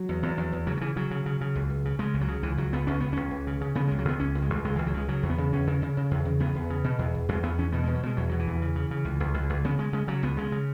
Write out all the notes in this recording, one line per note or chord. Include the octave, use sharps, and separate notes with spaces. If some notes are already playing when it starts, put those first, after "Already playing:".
Already playing: F#3
E2
E2
E2
E2
C#3 F#3
F#3
C#3 E3
C#3 F#3
C#3
C#3
C#3
C#2
C#2
C#3
C#3 G#3
C#2
F#3
C#3
C#2 E3
C#2 F#3
C#2 B3
C#2 C#4
C#2 B3
C#2 C#4
C#2
C#3
C#3
C#3 B3
C#2 G#3
F#3
C#2 B3
C#2 C#4
C#2
G#3
C#2
C#2 G#3
C#2 E3
F#3
C#3 G#3
C#3 F#3
E2
B3
C#3
E2 C#4
C#3
C#3
C#3
E2
C#3
E2 B3
E2
C#3
B2
E2
E2
E2 G#3
E2 B3
E2 C#4
B2 B3
B2 G#3
F#3
B2 G#3
E2 F#3
B2 F#3
E3
E2
C#3
C#3
C#3
C#2
C#2
C#2
C#2
C#3 B3
C#3 G#3
C#3 G#3
C#3 F#3
C#2 B3
C#3 G#3
C#3